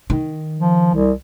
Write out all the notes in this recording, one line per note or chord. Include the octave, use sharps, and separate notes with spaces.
D#3
F3
C2